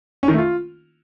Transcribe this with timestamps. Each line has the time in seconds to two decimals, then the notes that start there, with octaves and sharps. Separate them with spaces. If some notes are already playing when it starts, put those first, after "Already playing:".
0.23 C#4
0.28 D#3
0.33 A3
0.38 F4